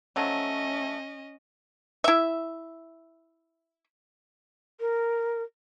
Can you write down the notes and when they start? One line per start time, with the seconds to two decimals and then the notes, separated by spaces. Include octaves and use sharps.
0.16 F3 F#3 A3 C#4 D#5
2.04 E4 E5
4.80 A#4